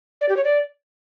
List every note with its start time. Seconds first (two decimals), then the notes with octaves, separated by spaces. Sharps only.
0.21 D5
0.29 G4
0.37 C#5
0.44 D5